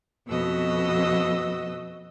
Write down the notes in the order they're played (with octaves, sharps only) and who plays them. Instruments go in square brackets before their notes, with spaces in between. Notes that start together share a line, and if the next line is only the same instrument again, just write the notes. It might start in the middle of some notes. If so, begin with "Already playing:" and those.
[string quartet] F2 B2 B3 F#4 D#5 E6